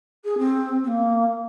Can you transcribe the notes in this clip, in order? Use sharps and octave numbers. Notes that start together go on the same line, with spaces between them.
G#4
C4
C4
A#3